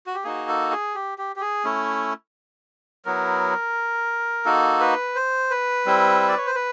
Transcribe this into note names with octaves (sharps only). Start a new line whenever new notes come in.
F#4
G4
A#3 D#4 F#4 G#4
A4
G#4
G4
G4
G4
G#4
A3 C#4 E4
F#3 B3 E4 A#4
A#3 D#4 F#4 A4
B4
C5
B4
G3 C4 E4
D5
C#5
C5
B4